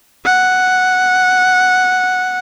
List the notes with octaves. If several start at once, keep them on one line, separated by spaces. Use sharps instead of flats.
F#5